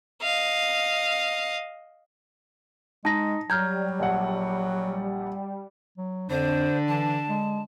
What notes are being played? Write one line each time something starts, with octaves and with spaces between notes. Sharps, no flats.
D#5 F5
G#3 D#4 A5 A#6
F#3 G3 A#5 F6 G6 G#6
A#1 F#5
F#3
F2 D3 D4 C5
E3 A5
G#3